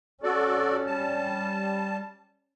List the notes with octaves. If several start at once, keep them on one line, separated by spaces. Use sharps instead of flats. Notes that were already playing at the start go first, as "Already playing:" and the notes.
C#4 F#4 A4 D5
G3 A5